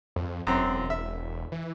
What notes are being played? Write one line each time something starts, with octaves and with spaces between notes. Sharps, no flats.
F2
E1 F#2 C4
E5
E3